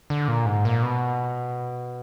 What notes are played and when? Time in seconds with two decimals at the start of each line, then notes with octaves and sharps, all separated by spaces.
0.10 D3
0.28 A#2
0.46 G#2
0.65 A#2
0.82 B2